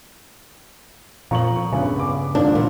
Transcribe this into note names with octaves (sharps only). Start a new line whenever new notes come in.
F2 A#2 A#5 C#6 F#7
C#2 G2 C#3 B3
D6
G#1 F2 D#3 F3 A#3 D4
A#2 E3